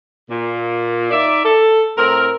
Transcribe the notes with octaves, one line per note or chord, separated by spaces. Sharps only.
A#2
D#4 D5 E5
A4
A2 A3 C4 A#4